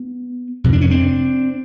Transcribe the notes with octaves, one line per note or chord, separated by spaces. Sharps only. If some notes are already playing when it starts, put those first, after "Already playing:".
Already playing: B3
F2 C3
D4
C#4
C4 D4